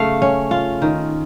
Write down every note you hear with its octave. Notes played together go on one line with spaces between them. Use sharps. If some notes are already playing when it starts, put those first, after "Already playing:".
Already playing: C#3 A3 F5
C#4
F4
D#3